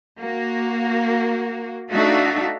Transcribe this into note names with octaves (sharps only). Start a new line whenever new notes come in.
A#3 F#4
A3 D4 D#4 F#4 E5 F5